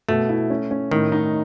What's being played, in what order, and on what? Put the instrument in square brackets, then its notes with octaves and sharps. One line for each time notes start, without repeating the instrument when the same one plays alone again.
[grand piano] B2 [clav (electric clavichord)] A3
[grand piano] E4
C#4
C#4
[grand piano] A2 [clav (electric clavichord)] D#3
[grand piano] D#4